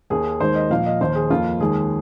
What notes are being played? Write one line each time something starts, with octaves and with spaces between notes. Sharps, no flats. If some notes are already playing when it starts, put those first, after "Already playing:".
D#2 D#3 A#3 G#4
D#2 D#3 G#3 C5
D#5
A#2 F3 A#3 F5
D#5
D#2 D#3 A#3 C5
G#4
F2 F3 A#3 F4
D#2 D#3 G#3 G#4